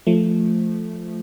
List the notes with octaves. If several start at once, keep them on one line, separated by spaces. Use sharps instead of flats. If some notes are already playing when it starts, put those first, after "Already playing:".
F3 A3